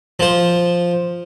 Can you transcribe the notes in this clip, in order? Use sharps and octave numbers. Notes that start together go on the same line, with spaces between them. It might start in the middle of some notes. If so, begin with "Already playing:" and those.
F3 C5